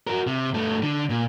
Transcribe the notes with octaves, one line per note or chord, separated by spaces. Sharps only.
F#4 A#4
C3
G2 A3
D3
A#2